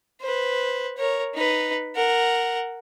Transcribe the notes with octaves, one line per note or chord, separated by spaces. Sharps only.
B4 C5
A#4 C#5
D#4 B4
A#4 F#5